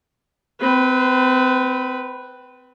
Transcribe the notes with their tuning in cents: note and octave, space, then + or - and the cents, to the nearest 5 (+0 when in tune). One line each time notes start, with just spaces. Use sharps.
C4 -30 B4 +0